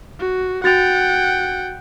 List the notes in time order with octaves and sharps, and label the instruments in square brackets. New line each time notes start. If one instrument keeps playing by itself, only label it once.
[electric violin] F#4
[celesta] F#4 A6 F7 [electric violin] F#5 G5